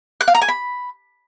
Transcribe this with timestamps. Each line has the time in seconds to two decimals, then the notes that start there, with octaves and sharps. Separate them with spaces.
0.21 F#6
0.28 F5
0.35 A#5
0.42 G#5
0.48 B5